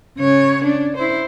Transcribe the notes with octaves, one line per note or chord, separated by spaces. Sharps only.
C#3 C#5
D4
E4 C5